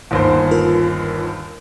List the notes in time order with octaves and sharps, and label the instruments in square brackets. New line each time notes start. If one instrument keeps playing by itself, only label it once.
[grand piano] G1 D#2 C5
[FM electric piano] F4 A#4 B4